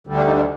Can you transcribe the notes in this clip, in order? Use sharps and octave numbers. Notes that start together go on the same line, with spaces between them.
D2 D3 G3
D4
D#4
D4